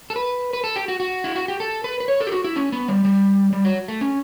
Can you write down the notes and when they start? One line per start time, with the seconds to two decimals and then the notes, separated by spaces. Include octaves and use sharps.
0.10 A4
0.16 B4
0.53 B4
0.64 A4
0.76 G4
0.88 F#4
1.00 F#4
1.24 E4
1.36 F#4
1.48 G4
1.60 A4
1.84 B4
2.00 B4
2.08 C#5
2.20 A4
2.27 G4
2.32 F#4
2.44 E4
2.56 C#4
2.72 B3
2.88 G3
3.05 G3
3.53 G3
3.64 F#3
3.88 A3
4.01 C#4